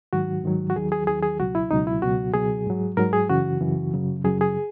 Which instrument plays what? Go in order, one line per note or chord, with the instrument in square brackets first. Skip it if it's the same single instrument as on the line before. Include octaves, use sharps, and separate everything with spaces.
[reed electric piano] G#2 D#3 F#3 F#4
G#2 D#3 F#3
F#4
D#2 D#3 F#3 G#4
G#4
D#2 D#3 F#3 G#4
G#4
C#2 B2 F#3 F#4
E4
C#2 B2 F#3 D#4
E4
C#2 B2 F#3 F#4
C#2 B2 F#3 G#4
G#2 F#3
G#2 F#3 A#4
G#4
F#2 C#3 E3 F#4
F#2 C#3 E3
F#2 C#3 F#3
F#2 C#3 F#3 G#4
G#4